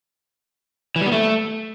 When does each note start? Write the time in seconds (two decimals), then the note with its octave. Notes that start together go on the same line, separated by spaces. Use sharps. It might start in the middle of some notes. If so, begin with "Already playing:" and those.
0.96 E3
1.01 G3
1.06 B3
1.12 A3